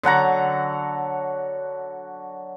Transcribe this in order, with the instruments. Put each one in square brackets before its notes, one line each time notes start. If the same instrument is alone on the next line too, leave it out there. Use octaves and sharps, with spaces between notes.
[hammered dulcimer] D3 F#3 F#5 A#5